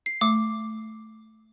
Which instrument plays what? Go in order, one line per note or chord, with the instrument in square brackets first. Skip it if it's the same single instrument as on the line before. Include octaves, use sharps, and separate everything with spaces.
[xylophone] C7
[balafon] A3 [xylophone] D6